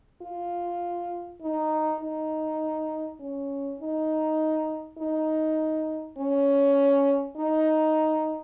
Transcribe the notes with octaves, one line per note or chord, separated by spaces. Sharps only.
F4
D#4
D#4
C#4
D#4
D#4
C#4
D#4